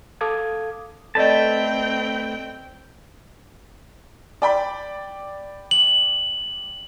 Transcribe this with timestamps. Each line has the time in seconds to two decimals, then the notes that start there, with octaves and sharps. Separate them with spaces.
0.21 A4 F5 D6 D#6 G#6
1.15 A3 C4 A4 B4 D5 D#5 G5 A5
4.42 D5 G5 B5
5.71 F#7